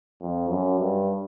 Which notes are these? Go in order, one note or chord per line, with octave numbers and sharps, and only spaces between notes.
F2
F#2
G2